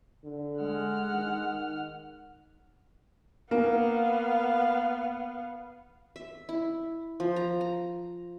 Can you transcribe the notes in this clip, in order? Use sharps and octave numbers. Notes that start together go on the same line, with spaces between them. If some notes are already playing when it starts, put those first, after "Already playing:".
D3
G#3 F#5 F6
D#3
A#3 B3 F5
E5
E4
F3
A#5
A#5